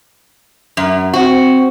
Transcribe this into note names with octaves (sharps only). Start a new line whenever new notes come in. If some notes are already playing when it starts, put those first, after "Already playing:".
F#2
C4 F#4